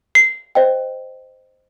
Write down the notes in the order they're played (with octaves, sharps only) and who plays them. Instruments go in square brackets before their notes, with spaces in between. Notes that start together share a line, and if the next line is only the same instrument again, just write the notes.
[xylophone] C7
C5 D#5 G5